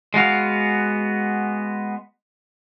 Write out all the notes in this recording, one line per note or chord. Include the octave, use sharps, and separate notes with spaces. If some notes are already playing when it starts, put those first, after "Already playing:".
G#3 B3 F#4 F5